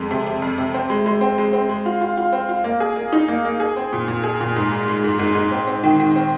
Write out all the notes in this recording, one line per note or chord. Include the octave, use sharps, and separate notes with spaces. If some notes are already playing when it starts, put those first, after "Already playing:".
Already playing: F2 G#3
C3
C3
F2
C3
C4
G#3
G#3
C4
G#3
C4
G#3
F4
F4
F4
C4
F4
A#3
G#4
A#3
D#4
A#3
A#3
G#4
C4
A#2
A#2
G#4
A#2
G#2
G#3
G#3
G#2
G#2
G#2
C4
C4
D#3
D#3
C4